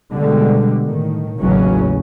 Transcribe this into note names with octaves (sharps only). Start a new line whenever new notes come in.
B2 D3 G3 G#3
A2 D#3
A1 D#2 C#3 E3 F#3 C#4